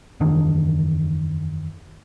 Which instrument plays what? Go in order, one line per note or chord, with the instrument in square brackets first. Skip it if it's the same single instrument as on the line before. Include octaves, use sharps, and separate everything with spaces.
[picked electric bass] F#1 E2 D#3 D4